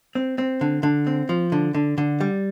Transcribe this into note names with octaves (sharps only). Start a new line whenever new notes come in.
C4
C4
D3
D3
C4
F3
D3
D3
D3
G3